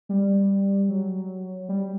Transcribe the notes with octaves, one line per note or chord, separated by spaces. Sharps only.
G3
F#3
G3